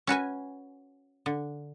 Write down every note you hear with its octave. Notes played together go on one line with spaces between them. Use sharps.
C#4 F#4 B4 G#5
D3